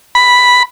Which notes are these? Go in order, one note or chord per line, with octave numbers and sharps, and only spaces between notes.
B5